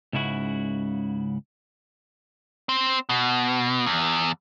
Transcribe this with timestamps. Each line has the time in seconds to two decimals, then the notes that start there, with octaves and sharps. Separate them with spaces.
0.13 C#2 G#2 C#3 E4 F#4
2.69 C4
3.09 B2
3.86 E2